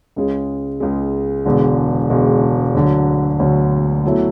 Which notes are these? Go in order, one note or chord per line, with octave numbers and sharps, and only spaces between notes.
C#2 C#3 G#3
C#2 C#3 G#3
E1 E2 D3 G#3
E1 E2 D3 G#3
D2 D3 F#3
D2 D3 F#3
B2 F#3 A3 E4